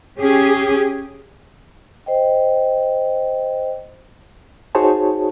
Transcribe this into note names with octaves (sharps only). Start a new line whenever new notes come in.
C#4 G4 G#4
C5 D#5 G5
D#4 F#4 G#4 C5 C#5 A5